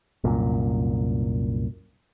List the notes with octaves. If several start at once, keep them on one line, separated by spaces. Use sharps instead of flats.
C2 F#2 A#2